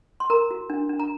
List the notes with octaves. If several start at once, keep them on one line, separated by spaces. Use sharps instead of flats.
C6
A#4 A#5
F#4
D4
D4
A#5